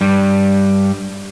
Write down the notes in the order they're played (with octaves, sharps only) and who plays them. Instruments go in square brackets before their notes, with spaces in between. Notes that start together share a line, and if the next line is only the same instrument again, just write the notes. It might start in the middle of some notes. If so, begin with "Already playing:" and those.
[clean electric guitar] G2 G3